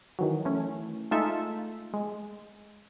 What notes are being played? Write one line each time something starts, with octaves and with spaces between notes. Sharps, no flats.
D#3 E3 F#3
E3 A3 C#4
G#3 A3 D#4 F4 A4 E5
G#3